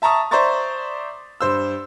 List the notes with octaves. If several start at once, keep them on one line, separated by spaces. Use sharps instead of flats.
E5 A5 A#5 C#6 D#6
C5 D5 E5 A#5 C#6 A6
G2 C5 E6